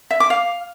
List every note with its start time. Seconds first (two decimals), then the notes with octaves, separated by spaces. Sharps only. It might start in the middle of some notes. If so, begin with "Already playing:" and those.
0.11 E5
0.20 D6
0.30 F5